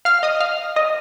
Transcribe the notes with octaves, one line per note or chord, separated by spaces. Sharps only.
F5 F6
D#5 D#6
F5 F6
D#5 D#6